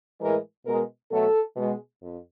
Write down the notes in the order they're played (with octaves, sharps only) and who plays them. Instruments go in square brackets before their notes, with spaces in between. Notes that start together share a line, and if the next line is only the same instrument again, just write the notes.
[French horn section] A2 E3 G#3 A#4
B2 G#3 A#4
B2 F#3 A3 A4
B2 G#3
F2